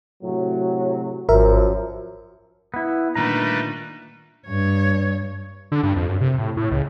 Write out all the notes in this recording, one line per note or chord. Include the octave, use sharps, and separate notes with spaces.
A2 C3 F#3
G#1 F#2 F3 A#4 E5
B3 E4
A#2 D3 D#3 G3 A3 B4 A#5
G2 C#5
D3
G2
F2
F#2
C3
A2
A2
C#2